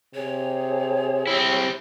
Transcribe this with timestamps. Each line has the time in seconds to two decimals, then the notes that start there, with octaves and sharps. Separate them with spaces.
0.14 C3 G#4 C#5
1.27 C4 E4 G4